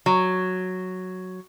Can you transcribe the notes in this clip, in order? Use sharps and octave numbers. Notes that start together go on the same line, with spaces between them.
F#3